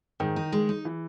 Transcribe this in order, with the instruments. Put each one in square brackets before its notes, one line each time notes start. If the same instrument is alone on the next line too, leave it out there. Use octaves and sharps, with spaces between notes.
[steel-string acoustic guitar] G#2 [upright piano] D#3
[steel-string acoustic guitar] D#4
G#3
D#4
[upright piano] E3